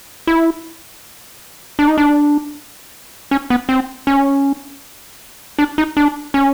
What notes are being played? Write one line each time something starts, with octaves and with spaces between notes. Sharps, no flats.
E4
D4
D#4
D4
C#4
B3
C4
C#4
D4
D#4
D4
C#4